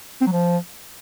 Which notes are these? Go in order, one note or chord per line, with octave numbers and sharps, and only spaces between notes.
C4
F#3
F3